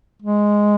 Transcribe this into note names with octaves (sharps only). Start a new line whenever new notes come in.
G#3